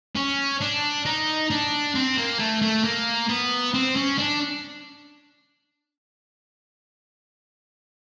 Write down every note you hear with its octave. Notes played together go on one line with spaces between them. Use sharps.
C#4
D4
D#4
D4
C4
A#3
A3
A3
A#3
B3
C4
C#4
D4